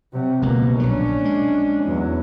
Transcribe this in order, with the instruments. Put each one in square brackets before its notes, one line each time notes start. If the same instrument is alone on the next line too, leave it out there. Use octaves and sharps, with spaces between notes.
[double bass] C3 F#3
[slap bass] D1 C#2 [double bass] B2 A#3
[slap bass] A#1 F#3 [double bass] C#4 D4
[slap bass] G#3
[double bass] E2 F#3